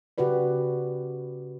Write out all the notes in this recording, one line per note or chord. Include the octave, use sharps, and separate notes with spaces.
C#3 F#4 G4 B4 D5